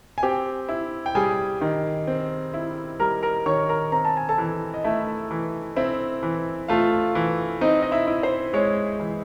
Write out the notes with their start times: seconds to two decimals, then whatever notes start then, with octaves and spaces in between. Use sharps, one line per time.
0.18 G#5
0.23 C4 G4 G5
0.69 E4
1.06 G5
1.15 G3 G#4 G#5
1.61 D#3
2.07 C4
2.54 E4
3.00 G3 A#4 A#5
3.23 A#4 A#5
3.46 D#3 C#5 C#6
3.69 A#4 A#5
3.92 C4 A#5
4.05 A5
4.17 G#5
4.29 A4 A5
4.38 E3
4.74 D#5
4.84 A3 E4 E5
5.31 E3
5.76 C4 E4 E5
6.23 E3
6.68 A3 F4 F5
7.15 E3
7.61 C4 D#4 D#5
7.82 D#5
7.92 E4 E5
8.07 E4
8.23 C5
8.53 G#3 C#5
9.00 E3